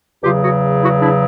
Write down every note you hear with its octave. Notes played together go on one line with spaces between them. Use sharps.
E2 C#3 F#3 F4 G4
F#4 G#4
E4 F#4
D4 E4